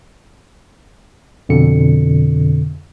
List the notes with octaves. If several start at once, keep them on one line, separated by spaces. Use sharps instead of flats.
F2 B2 D3 C#7